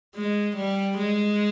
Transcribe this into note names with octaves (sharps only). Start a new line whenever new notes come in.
G#3
G3
G#3